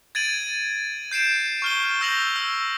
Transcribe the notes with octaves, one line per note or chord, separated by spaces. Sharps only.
G#6 A6 D7 D#7 F#7
G6 C7 D7 E7
C#6 F6 G7
F6
E6 G6 A#6 F7 F#7
E6